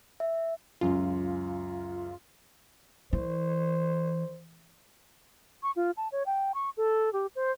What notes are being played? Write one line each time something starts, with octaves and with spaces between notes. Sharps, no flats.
E5
C#2 F#2 F4
E3 C5
C#6
F4
A5
C#5
G5
C#6
A4
G4
C5